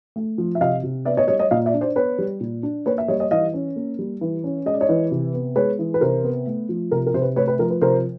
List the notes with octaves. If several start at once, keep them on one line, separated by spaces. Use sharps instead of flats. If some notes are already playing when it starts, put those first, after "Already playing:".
A3
F3
E5
C3 D#5 F5
C3
B3 D5 E5
C#5 D#5
G3 C#5 D#5
C#5 D#5
A#2 D#5 F5
D5 E5
D4
C5 D5
B3 B4 C#5
G3
A#2
D4
A#3 B4 C#5
E5
G3 C#5 D#5
C#5 D#5
E3 D#5 F5
C#4
A#3
G3
E3
C#4
G#3 D#5
D5
C#5 D#5
E3
C3
B3
G#3 B4 C#5
E3
B4
C3 A#4 C5
B3
A3
F3
C3 A#4
A#4
C3 C5
B4
A3 B4 C#5
B4
F3 A#4
B4
C3 A#4 C5